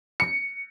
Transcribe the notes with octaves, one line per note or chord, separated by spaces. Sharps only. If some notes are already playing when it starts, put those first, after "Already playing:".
C#7